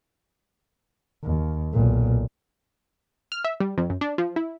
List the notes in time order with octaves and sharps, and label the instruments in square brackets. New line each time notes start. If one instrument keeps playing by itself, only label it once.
[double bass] D#2
B1 A#2
[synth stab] F6
E5
G3
F2
F#2
D4
F3
E4